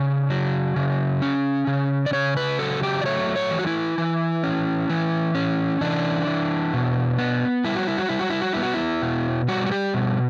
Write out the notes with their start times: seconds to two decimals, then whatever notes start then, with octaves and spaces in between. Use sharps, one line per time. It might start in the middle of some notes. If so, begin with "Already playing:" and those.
Already playing: C#3 D5
0.30 F#3
0.76 C#3
1.22 C#4
1.67 C#3
2.06 D5
2.13 C#3 C#5
2.37 B4
2.59 F#3 A4
2.83 G4
3.01 D5
3.05 A3 C#5
3.36 C#5
3.51 E3
3.59 F#4
3.67 E4
3.98 E3
4.43 C#4
4.90 E3
5.35 C#4
5.81 E3 D4
6.27 E3
6.74 B2
7.18 B3
7.64 G3 E4
7.75 F#4
7.87 E4
7.98 F#4
8.09 G3 E4
8.19 F#4
8.30 E4
8.41 F#4
8.53 B3 E4
8.63 F#4
8.74 E4
9.02 B2
9.48 G3 F#4
9.66 F#4
9.72 G4
9.94 B2